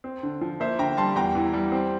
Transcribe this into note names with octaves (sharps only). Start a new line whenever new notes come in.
C4
D3
F3
A#3 C5 E5
D3 G5 A#5
G3 A5 C6
E2 G5 A#5
E3
G3
C4